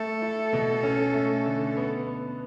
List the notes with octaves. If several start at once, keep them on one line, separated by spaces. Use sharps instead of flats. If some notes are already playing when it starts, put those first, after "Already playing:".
Already playing: A3 A4
E4
B2
C#4
A3
D3
B3
B3